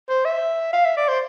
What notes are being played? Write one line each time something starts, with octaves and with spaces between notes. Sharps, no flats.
C5
E5
F5
E5
D5
C5